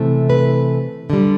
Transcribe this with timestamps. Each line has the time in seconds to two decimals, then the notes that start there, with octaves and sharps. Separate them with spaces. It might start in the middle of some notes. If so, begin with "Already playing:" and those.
Already playing: C3 E3 A3
0.30 B4
1.10 D3 G3